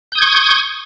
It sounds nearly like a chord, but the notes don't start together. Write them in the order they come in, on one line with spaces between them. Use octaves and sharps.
G6 D#6 G#6 C#6